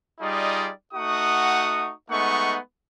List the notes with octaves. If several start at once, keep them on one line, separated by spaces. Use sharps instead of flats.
G3 D#4 F4 G#4 D5 D#5
A3 D#4 F#4 F#5 C#6 D#6
G#3 A3 B3 D#4 F#5 C#6